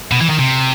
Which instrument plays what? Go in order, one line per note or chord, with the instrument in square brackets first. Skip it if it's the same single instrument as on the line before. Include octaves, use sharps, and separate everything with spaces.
[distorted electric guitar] B2
E3
D#3
C3